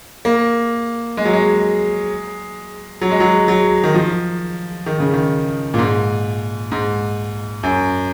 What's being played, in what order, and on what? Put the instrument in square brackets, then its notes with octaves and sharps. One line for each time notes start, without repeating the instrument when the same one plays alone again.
[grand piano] A#3
G#3
F#3
G#3
F#3
G#3
F#3
F#3
D#3
F3
D#3
C#3
D#3
A#2
G#2
G#2
F#2